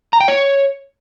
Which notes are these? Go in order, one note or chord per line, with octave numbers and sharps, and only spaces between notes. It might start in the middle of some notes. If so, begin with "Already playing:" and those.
A#5
G5
C#5